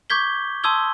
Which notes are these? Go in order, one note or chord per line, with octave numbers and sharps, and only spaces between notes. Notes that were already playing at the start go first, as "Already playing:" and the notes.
C#6 D6 G6 G#6 B6 G7
A5 C6 D#6 E6 G#6 G7